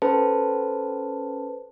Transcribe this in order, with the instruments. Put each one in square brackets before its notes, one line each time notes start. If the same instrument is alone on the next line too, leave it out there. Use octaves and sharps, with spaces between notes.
[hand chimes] C#4 A4 B4 C5 A5